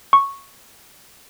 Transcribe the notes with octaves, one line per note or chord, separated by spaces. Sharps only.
C#6